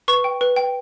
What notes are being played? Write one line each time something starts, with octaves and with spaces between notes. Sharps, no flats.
B4 C#6
G5
B4
G5